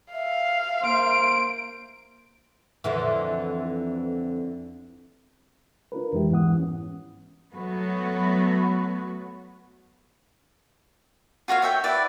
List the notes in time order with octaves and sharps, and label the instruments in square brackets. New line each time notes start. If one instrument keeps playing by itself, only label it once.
[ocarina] E5 [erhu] F5
[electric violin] A#3 D7 [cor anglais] C5
[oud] F2 D3 E3
[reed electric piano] D4 F4 A#4 B4
F2 E3 G#3 E4 G4
G#2 E3 B3 F#5 D#6
C#4
[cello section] F#3 A3 B3 F#4 B4
[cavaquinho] F4 F#4 C#5 F5
C#5 E5 G5
E4 B4 D5